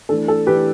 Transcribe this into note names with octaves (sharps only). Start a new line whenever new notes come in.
E3 A3 D4 A4
A4
E3 A3 D4 G4 B4